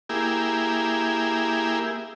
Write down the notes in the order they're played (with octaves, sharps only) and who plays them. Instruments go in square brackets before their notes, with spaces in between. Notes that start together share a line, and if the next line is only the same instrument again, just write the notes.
[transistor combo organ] A#3 E4 G4 G#4